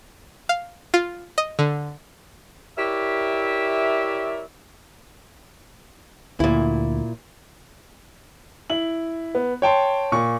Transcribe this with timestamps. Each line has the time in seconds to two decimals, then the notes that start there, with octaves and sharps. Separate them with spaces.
0.49 F5
0.94 F4
1.38 D#5
1.59 D3
2.78 E4 G4 A#4 C#5 D5 E5
6.40 D2 A#2 E4
8.70 E4 F#7
9.35 B3
9.62 C#5 G5 A5 C6
10.12 A#2 C#6